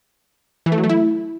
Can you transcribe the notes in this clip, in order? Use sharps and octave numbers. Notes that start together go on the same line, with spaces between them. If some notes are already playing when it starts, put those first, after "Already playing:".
E3
A3
F#3
A3
E4